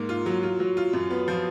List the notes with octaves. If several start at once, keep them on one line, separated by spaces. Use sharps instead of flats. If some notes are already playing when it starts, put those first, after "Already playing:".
Already playing: G#2 A#3
F4
F#3
F4
F#3
F4
F#2
B3
F3